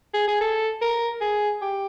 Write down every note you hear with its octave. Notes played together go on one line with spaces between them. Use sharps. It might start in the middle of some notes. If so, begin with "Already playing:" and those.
G#4
G#4
A4
A#4
G#4
G4